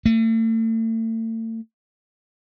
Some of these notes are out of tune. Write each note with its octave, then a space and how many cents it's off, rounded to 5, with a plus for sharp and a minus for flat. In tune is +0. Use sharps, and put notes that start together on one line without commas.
A3 +40